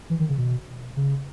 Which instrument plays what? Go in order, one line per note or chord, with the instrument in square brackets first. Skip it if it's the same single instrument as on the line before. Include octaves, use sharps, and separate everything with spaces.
[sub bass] E3
D#3
C#3
B2
C#3